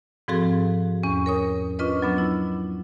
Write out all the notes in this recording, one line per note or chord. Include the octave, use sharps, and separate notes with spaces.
G#2 F3 C4 F#4 G#4 A4
E2 C#4 C#6
A#4 C#5 D#6
C#4 D4 F4 B4 D#5
F#3 B3 D4
E4